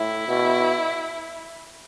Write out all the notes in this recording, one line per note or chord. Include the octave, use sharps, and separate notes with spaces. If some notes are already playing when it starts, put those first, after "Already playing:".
Already playing: A2 E4
B2